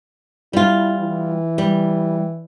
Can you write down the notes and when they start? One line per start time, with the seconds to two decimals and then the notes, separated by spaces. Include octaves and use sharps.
0.53 G3 E4 F4
1.00 E3
1.58 G3